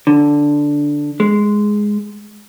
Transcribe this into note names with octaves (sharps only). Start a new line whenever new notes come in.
D3
G#3